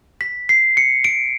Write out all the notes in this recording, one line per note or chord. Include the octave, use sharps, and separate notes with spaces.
B6
C7
C#7
D7